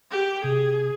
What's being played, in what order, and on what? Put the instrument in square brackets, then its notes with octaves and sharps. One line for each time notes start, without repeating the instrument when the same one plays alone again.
[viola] G4
[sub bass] C3 [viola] G#4